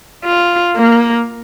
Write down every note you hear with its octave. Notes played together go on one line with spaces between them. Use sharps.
F4
A#3